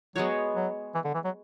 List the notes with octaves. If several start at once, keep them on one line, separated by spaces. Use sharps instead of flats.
F#3 G#3 B3 F#4 C#5
F#3
E3
D3
E3
F#3